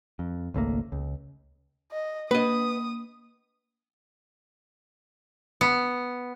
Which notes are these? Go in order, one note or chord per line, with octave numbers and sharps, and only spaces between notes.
F2
G#1 C#2 A3 A#3
C#2
D#5
A#3 B4 D#5 D#6
B3